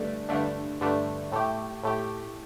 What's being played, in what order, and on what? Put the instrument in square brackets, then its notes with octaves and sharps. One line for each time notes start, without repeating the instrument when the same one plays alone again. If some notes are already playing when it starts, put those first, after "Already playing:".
Already playing: [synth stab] G2 D3 A3 D4
G2 D3 A3 D4
G2 D3 A3 D4
A2 A3 G4
A2 A3 G4